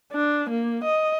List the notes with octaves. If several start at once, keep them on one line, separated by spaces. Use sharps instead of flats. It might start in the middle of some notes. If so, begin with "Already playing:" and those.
D4
A#3
D#5